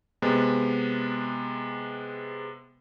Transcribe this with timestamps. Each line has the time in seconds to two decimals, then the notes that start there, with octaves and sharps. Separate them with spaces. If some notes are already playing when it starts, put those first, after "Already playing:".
0.22 C3 G#3 B3